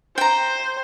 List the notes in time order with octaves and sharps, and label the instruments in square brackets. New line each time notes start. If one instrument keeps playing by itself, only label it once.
[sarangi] C5 [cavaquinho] G5 A#5